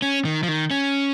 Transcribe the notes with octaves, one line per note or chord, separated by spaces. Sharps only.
C#4
D#3
F3
D#3
C#4